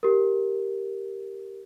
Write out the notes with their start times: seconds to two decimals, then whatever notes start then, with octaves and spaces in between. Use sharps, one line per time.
0.03 G4 A#4